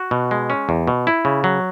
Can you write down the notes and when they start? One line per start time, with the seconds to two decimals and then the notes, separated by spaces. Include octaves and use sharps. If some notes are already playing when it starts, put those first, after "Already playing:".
Already playing: F#4
0.11 B2
0.31 G#3
0.50 C#4
0.69 E2
0.87 B2
1.07 E4
1.25 C#3
1.44 F#3